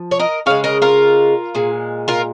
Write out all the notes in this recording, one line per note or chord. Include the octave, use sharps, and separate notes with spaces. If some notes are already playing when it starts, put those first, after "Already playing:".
Already playing: F3
C#5
A#4 D#5
C#3 G#3 C#5 F5
A#4 D#5
F4 A#4
A#2 G#3
F4 A#4